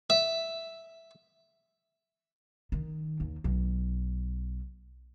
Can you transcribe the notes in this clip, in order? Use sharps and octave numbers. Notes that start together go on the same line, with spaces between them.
E5
D#3
D#2
B1